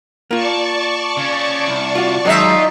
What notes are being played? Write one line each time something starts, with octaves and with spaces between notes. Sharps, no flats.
A#3 F4 D5 A5 C#6
C#3 C#4
C2
F4 F#4
D#3 F#3 G#3 D#4 F4 E5